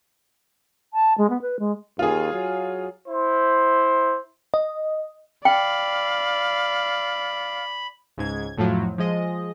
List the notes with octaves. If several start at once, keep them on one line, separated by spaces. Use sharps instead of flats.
A5
G#3
B3
B4
G#3
D#2 F4 G#4
F#3
E4 C5
D#5
D5 F5 G5 B5
C#2 G#2 G#6
F2 A2 F3 F#3
F3 G#3 D#5